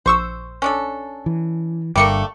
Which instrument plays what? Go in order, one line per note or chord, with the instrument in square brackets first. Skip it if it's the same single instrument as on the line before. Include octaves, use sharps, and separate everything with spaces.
[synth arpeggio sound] A#1 C#6 E6 [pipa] C5
[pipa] C#4 D4 A4
[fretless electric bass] E3
[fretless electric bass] G1 G2 [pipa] G3 A3 A#3 [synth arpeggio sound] D6 C#7